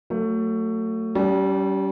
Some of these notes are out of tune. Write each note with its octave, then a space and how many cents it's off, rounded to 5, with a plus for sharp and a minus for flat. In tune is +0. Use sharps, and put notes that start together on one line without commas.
F#3 +0 A3 +25
G3 -25 C#4 +25